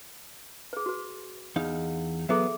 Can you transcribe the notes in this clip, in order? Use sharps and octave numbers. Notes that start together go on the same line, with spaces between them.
G#4 B4
F#4 B4
E2 D#4 F5
F#3 B3 G#4 A4 E5